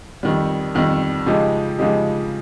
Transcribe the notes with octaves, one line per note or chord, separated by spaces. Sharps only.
F2 D#3 G3
F2 D#3 G3
C#3 F3 G#3 D#4 G4
C#3 F3 G#3 D#4 G4